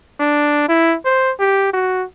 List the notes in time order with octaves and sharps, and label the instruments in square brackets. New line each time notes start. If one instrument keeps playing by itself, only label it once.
[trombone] D4
E4
C5
G4
F#4